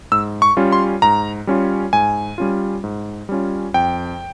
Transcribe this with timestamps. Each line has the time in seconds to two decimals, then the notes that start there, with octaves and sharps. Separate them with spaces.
0.12 G#2 E6
0.42 C#6
0.57 G3 C#4 F4
0.72 C6
1.02 G#2 A#5
1.47 G3 C#4 F4
1.93 G#2 G#5
2.38 G3 C#4 F4
2.84 G#2
3.29 G3 C#4 F4
3.74 F2 G5